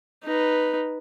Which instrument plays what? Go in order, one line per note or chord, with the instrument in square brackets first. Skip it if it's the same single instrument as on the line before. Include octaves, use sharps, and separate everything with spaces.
[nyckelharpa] D#4 B4